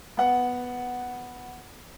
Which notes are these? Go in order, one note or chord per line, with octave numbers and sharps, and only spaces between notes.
B3 F#5